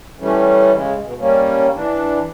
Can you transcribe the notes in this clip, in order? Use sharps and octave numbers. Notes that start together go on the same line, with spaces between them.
E3 G3 A3 C#4
C#3 G#3
B2
G3 A#3 C#4
E3 D4